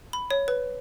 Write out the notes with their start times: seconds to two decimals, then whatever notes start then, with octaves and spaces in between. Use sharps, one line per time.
0.13 B5
0.31 C#5
0.48 B4